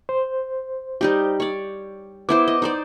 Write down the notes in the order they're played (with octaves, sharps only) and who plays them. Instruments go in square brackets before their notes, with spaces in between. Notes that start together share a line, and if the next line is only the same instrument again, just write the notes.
[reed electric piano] C5
[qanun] G3 D#4 G4
C#5 D5
[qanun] B3 E4 C5 [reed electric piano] D6
[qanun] D#5
D#4 C5 D5